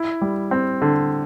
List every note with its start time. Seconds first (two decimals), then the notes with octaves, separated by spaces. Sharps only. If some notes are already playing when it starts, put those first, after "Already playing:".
Already playing: E4
0.21 G3
0.51 C4
0.82 D3